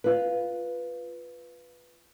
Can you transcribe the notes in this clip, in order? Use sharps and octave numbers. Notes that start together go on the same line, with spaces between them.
F4 B4